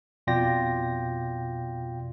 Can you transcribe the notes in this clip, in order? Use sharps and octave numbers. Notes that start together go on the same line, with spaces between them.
F2 B2 F4 D5 G5 A#6